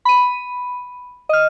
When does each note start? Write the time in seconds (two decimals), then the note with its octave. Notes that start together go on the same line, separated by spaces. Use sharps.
0.05 B5 D#7
1.29 D#5 F6